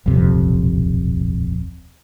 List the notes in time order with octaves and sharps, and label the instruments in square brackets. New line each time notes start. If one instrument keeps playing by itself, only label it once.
[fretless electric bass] D#1 B1 F2 C3